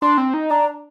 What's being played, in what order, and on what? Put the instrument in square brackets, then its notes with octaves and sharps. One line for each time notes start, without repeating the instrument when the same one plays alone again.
[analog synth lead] D4 [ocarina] C6
[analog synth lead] C4
D#4
[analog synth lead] D4 [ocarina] A#5